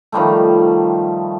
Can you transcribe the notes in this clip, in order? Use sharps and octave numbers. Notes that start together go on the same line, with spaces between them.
D#3 F3 G3 A3